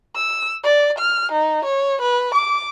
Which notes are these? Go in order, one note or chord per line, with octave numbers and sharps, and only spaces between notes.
E6
D5
F6
D#4
C#5
B4
D6